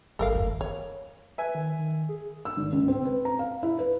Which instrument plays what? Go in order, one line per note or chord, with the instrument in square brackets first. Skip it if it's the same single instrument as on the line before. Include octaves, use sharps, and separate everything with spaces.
[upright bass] A1 G3 [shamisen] A4 A#4 F5
[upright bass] F#1 E2
D#3
[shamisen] C#5
[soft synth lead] B4 [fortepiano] E5 G#5
[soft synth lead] D#3
D#3
G#4
[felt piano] E6
G#1
C#2
C4
B4
A#5
F5
E4
B4